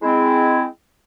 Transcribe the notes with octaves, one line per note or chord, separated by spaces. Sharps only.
G#3 C4 E4